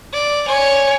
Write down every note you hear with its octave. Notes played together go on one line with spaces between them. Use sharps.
D5
C#5 G#5